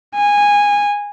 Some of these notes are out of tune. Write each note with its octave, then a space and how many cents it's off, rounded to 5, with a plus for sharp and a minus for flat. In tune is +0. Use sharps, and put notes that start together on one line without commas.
G#5 -15